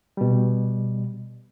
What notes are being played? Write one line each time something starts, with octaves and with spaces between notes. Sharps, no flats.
B2 G3